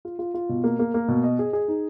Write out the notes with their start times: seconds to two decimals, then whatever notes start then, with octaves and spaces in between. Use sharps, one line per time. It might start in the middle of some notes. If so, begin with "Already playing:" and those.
0.05 F4
0.19 F4
0.34 F4
0.49 B2
0.64 A#3
0.79 A#3
0.94 A#3
1.08 B2
1.23 D#5
1.39 G#4
1.53 G#4
1.68 D#4